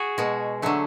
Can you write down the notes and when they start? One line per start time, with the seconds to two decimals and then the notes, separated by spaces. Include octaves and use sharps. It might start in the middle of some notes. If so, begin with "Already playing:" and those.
Already playing: F#4 G#4
0.18 B2 G#3
0.62 D3 F#3 A3